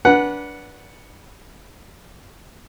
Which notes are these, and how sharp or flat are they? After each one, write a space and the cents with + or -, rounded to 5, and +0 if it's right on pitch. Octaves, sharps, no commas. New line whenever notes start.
D4 -20 B4 -25 F#5 +0